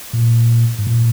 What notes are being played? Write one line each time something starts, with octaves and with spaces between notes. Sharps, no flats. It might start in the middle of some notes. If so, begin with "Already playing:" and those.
A#2
G#2
A#2